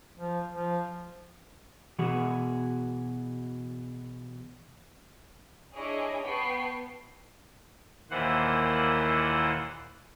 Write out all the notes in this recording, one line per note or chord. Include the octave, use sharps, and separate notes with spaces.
F3
F3
B2 E3 F#4 G#4 F#5
D4 E4 G#4 C#5 D#5 D6
B3 G5 A5 C#6 C7
D#2 A#2 E3 C5 F#5